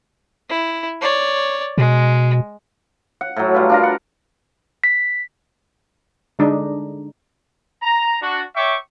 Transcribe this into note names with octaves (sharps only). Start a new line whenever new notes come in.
E4
C#5 D5
B2 G#3
F#5
A2 F#3
G3 F4 B4
D4 F4 A#4
F#5
B6
D3 G#3 D4 D#4
A#5
D4 F#4
C#5 E5 G5 C#6 D6